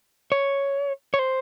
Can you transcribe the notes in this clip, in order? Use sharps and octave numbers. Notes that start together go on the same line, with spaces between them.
C#5
C#5
C5